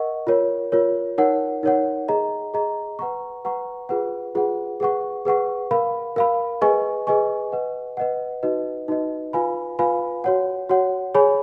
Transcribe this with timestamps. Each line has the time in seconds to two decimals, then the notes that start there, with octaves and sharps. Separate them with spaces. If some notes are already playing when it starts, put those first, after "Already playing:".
Already playing: A#4 D#5 F#5 C#6
0.27 F4 A#4 C#5
0.72 F4 A#4 C#5
1.18 D#4 A#4 C#5 F#5
1.63 D#4 A#4 C#5 F#5
2.08 G#4 D#5 A#5
2.54 G#4 D#5 A#5
2.99 B4 F#5 A#5 C#6
3.45 B4 F#5 A#5 C#6
3.89 F4 G#4 B4 F#5
4.35 F4 G#4 B4 F#5
4.80 G#4 B4 F#5 C#6
5.25 G#4 B4 F#5 C#6
5.71 A#4 F5 B5
6.16 A#4 F5 B5
6.61 G#4 B4 D#5 G#5 C#6
7.07 G#4 B4 D#5 G#5 C#6
7.52 B4 D#5 F#5
7.97 B4 D#5 F#5
8.43 D#4 F#4 B4 D#5
8.88 D#4 F#4 B4 D#5
9.33 F4 B4 F5 G#5 B5
9.79 F4 B4 F5 G#5 B5
10.24 F#4 C#5 F#5
10.69 F#4 C#5 F#5
11.15 G#4 C#5 G#5 B5